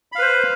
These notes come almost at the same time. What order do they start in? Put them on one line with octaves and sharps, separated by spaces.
B5 F5 B4 C5